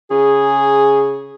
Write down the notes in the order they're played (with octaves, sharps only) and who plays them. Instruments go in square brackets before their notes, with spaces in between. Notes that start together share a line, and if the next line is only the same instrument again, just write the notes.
[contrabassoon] C#3 [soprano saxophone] G#4